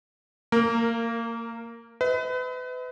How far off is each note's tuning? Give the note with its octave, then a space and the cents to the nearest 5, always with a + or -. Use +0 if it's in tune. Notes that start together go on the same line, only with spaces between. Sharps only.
A#3 -25 A#4 +0
B4 +35 D#5 +45